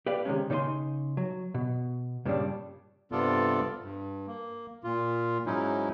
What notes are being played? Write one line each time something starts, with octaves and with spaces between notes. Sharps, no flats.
G4 B4 D5 F5
C3 D#3 G#3 C#4
C#3 D#4 C#5 D5 G#5 C6
F#3
B2
G2 A#2 C#3 G3 D4
G2 C3 B3 F4 A4 D5
G2
A#3
A#2 F4
G#2 F#3 C#4 D#4 E4